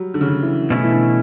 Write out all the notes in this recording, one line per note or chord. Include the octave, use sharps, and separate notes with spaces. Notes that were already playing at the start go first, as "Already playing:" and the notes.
Already playing: F#3 G3
D3
C#3
D3
E3
B2 E3 A3 C#4 E4
E3
D3